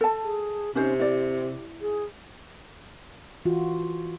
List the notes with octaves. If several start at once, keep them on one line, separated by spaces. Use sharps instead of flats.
A4 A5
G#4
C3 C#4 D#4 C5
E4 G4 D5
G#4
E3 F4 F#4